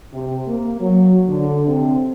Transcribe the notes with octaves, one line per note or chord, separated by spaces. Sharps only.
C3
A#3
F#3
D3
C3